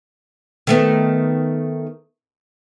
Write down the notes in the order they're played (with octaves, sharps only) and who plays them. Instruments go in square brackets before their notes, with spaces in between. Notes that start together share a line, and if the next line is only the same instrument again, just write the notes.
[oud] D#3 A3 B3